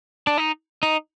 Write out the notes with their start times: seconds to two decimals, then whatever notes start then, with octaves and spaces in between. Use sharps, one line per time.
0.27 D4
0.38 D#4
0.83 D#4